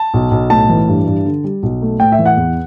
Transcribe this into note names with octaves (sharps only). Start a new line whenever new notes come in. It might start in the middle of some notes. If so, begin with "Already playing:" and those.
Already playing: A5
B1
B1
A2 A5
E3
G2
G2
D3
G3
B1
A3
A2 G5
E5
E3
F#5
E2